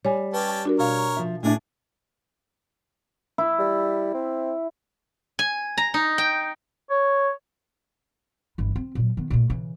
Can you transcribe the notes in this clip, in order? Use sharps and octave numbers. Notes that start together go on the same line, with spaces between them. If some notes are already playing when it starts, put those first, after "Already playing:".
G3 C#5 G#5
C#4 G4 B4 A5
D4 F#4 A#4
B2 A#4 C#5 F5
F3 E5
A2 D4 G#4 E5
E4
G3
C4
G#5
A#5
D#4
G5
C#5
G1 E3
C4
A#2 F#3
D#3 B3
A#2 A3
C#3 E3